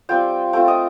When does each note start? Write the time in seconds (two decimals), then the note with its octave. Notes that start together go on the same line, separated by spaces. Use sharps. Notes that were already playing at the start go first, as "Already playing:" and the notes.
0.09 G3 C4 F4 G5
0.53 A3 C4 F4 G5
0.68 D#5